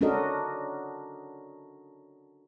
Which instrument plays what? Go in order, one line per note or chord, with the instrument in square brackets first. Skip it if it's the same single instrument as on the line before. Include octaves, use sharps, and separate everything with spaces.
[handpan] C#4 D4 F#4 A4 A#4 D#5